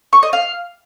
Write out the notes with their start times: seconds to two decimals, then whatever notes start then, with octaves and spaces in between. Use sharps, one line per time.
0.13 C#6
0.23 D#5
0.33 F5